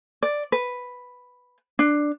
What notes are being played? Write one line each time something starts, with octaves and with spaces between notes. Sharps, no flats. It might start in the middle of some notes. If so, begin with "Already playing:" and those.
D5
B4
D4